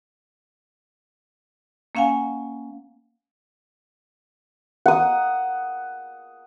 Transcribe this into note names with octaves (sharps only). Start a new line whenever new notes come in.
A#3 C#4 F5 F#5 G#5
F#5 D#6